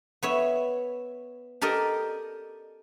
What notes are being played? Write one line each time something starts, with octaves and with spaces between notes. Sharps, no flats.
B3 C#5 E5
G4 A4 A#4 D5 D#5